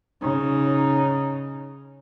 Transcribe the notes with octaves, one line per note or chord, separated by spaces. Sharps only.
C#3 D#4